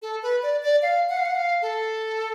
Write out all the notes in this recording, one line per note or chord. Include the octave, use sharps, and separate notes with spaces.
A4
B4
D5
D5
F5
F#5
F5
F#5
F5
A4